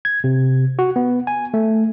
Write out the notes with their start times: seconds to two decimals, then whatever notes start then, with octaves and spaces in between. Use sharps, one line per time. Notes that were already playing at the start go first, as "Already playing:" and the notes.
0.05 G#6
0.24 C3
0.79 F#4
0.96 B3
1.27 G#5
1.54 A3